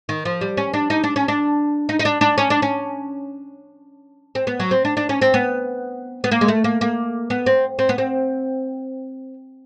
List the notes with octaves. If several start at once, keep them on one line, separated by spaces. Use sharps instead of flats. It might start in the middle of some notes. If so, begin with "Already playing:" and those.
D#3
F3
G3
C#4
D4
D#4
D4
C#4
D4
D#4
D#4
D4
D4
C#4
D4
C#4
C4
B3
F#3
C4
D4
D4
C#4
C4
B3
B3
A#3
G#3
A3
A#3
A#3
B3
C4
C4
B3
C4